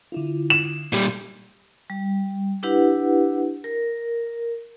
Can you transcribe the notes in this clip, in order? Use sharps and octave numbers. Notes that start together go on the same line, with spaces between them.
D3 E4 F4
E7
A#2 G3
G3
D4 E4 G4 B4 F#5
A#4